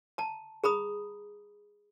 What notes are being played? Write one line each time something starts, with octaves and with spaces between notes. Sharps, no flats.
A5 A#5
G#4 A#5 B5 D#6